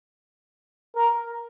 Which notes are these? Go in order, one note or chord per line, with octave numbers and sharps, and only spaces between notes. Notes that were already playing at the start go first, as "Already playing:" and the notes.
A#4